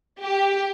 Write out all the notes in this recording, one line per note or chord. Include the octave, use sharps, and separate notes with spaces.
G4